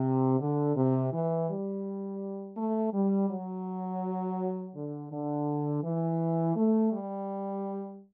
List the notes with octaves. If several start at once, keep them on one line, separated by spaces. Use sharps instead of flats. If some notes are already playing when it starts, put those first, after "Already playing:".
Already playing: C3
D3
C3
E3
G3
A3
G3
F#3
D3
D3
E3
A3
G3